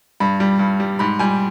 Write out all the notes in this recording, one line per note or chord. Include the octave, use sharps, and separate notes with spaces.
G2 B5
G3
G2
G3
G#2 B5
G3 G#5